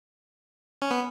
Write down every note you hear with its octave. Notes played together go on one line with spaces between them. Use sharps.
C#4
B3